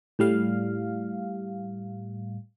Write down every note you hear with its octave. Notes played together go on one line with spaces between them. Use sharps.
A2 G3 F5